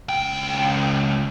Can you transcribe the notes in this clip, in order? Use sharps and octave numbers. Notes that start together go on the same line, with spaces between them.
C#2 G5